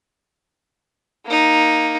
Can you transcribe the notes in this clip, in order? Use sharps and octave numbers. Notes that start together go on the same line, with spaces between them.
A#3 D#4